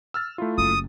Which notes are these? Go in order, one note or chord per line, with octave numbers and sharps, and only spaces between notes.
E6 F6 A6
A3 E4 F4
F#1 D#6